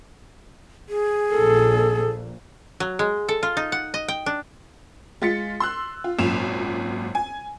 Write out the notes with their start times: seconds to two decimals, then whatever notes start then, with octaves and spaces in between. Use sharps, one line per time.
0.89 G#4
1.34 A#1 A#2 A4
2.80 F#3
2.99 G#3
3.28 A4
3.43 F4
3.57 D#4
3.72 F#5
3.94 D#5
4.08 G5
4.26 D4
5.22 G#3 F4 A6 B6 C#7
5.60 C6 E6 F#6
6.04 F4
6.19 G#1 F#2 A#2 E7 F7
7.15 G#5